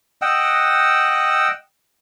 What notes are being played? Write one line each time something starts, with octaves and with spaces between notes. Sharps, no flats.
D#5 F#5 G5 E6